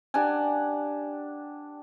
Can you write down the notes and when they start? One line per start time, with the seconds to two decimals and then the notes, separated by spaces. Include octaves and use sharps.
0.14 D4 G4 F#5 G#5